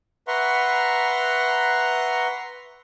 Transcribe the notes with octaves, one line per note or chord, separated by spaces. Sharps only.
B4 E5 F#5 A#5 C6 C#6